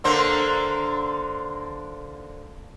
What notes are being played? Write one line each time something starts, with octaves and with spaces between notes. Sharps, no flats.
D3 A#3 C5